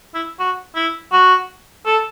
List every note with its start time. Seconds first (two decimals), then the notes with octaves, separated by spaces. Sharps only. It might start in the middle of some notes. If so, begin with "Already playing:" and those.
0.14 E4
0.39 F#4
0.76 E4
1.13 F#4
1.86 A4